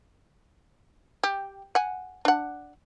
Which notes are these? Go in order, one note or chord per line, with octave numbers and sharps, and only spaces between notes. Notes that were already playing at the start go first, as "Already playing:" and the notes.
G4
F#5 G#5
D4 F#5